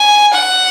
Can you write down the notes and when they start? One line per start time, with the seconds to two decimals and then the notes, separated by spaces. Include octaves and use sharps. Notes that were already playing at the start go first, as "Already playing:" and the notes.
Already playing: G#5
0.34 F#5